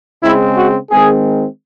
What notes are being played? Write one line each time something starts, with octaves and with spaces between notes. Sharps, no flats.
C#3 G#3 C4 E4
F#4
D#3 G#3 C4 G#4